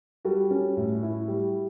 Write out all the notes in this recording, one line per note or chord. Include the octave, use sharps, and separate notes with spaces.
G3 F#4 A4
C#4
A2
E4
G3